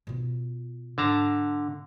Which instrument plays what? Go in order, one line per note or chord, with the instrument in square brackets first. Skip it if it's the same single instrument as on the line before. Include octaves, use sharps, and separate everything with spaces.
[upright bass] B2 F4
[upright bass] G#2 [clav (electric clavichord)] D3 A5 A#5